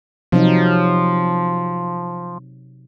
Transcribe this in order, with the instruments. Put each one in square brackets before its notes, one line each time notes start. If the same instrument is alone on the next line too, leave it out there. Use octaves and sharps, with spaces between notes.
[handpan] C3 F#3 D#4 [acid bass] F3